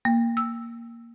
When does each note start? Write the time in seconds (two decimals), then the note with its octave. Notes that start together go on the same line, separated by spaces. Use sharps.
0.05 A#3
0.37 E6